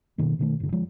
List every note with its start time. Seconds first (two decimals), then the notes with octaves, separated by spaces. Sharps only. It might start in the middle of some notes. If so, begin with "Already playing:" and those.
0.18 B2 D3 D#3 A#3
0.39 B2 D#3 A3
0.60 F#1 D3
0.72 F3 G#3